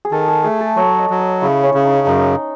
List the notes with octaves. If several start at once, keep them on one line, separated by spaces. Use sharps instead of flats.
G#4
D#3 A4
G#4
A3 G#4
A4
F#3 C#5
D#5
F#3
D#5
C#3 E4
C#4
C#3
D#4
F#2 D#4